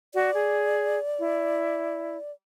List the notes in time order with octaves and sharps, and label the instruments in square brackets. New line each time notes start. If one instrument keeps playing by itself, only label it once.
[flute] F#4 [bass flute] D5
[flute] G#4
E4